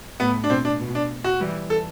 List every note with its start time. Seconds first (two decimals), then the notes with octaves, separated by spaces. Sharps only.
0.20 A2 B3
0.44 D4
0.50 B2 C4
0.65 D4
0.80 B2
0.95 D4
1.24 F#4
1.40 E3 G3
1.70 A4